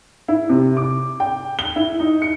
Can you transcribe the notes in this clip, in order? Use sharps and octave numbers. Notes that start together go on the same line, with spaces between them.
E4
C3
D6
G5
G7
E4
D#4
C#7